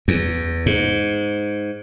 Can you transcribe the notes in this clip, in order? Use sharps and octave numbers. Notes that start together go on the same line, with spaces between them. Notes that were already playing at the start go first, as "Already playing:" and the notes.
E2
G#2